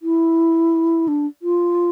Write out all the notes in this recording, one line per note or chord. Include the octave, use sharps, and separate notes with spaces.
E4
D4
F4